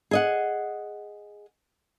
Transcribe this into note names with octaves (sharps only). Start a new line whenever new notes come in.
G#4 D#5 F#5